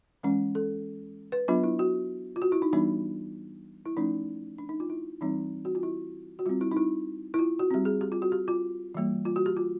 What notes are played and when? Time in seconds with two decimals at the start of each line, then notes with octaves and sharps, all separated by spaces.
0.23 E3 G#3 C#4
0.55 A4
1.32 B4
1.48 F#3 B3 D4 F4
1.64 E4
1.79 F#4
2.36 F4
2.42 F#4
2.52 E4
2.62 D#4
2.73 E3 G3 B3 D4 D#4
3.86 E4
3.97 F3 A3 C#4 D#4
4.58 D4
4.69 D#4
4.80 F4
4.90 E4
5.21 E3 G3 C4 D#4
5.65 F#4
5.75 F4
5.83 E4
6.39 F#4
6.46 G3 C4 F4
6.61 E4
6.71 D#4
6.77 E4
7.34 E4
7.39 F4
7.59 F#4
7.71 G3 C4 G4
7.85 G#4
8.01 G4
8.12 F4
8.22 F#4
8.32 G4
8.48 F4
8.95 E3 G3 A#3
9.25 F4
9.36 F#4
9.46 G4
9.57 F4